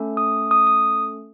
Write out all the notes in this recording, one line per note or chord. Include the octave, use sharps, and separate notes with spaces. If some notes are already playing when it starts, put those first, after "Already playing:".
Already playing: A3 C#4 A4
D#6
D#6
D#6